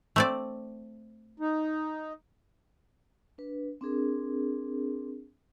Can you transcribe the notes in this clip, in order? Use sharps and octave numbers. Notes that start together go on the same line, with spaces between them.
A3 C4 D5
D#4
D4 B4
C4 D4 G#4 A#4